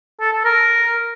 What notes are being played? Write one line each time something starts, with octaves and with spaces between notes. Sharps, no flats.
A4
A4
A#4